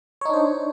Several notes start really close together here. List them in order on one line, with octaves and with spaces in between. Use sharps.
C#5 D#4 D4 C5